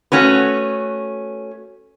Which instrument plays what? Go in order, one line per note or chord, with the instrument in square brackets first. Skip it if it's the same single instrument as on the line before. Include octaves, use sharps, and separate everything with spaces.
[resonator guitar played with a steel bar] A3 C#4 F#4 B4